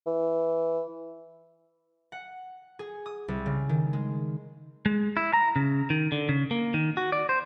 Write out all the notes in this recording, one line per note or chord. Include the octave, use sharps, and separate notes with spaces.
E3
F#5
G#4
D#6
C2
C#3
D#3
G#3
G#3
E4
A#5
C#3
D#3
D3
C#3
A#3
D#3
F#4
D5
C5